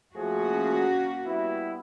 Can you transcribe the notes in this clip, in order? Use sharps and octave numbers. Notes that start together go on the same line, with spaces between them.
F3 A3 A#3 C#4 F#4 G#4
G2 B3 E4